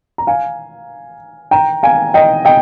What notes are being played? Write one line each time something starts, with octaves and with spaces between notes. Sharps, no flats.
A#5
F5 G#5
G5 A#5
F5 G#5
D#5 G5
D#5 G5